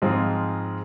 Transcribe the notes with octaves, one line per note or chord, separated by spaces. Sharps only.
G#2 F3 G#3 C4 F4